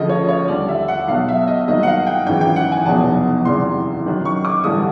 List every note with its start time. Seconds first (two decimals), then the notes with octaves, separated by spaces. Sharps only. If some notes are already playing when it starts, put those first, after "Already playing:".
Already playing: D2 C#3 F3 A3 D#5
0.09 C#5
0.29 C#5
0.48 D#2 D3 G3 D5
0.69 E5
0.88 F#5
1.08 B1 B2 F#3 F5
1.28 E5
1.48 D#5
1.67 G2 D#3 F#3 A#3 D#5
1.83 F#5
1.87 F5
2.07 G5
2.26 G#1 F#2 C#3 E3 G5
2.41 G5
2.56 F#5
2.72 G#5
2.86 F1 E2 B2 F#3 A5
3.45 F#1 E2 C3 E3 G3 C6
4.05 F#2 D#3 F#3
4.25 C#6
4.45 D6
4.64 A1 G2 D3 G3 D#6